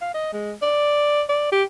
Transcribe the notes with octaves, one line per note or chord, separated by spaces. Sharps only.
F5
D#5
G#3
D5
D5
G4